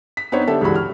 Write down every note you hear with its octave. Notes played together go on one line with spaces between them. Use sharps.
B6
B3 C4 D4 D#4 C5 C#5
D3 G4 A4 E5
C#2 G2 E3 G3 F#4 B5
F6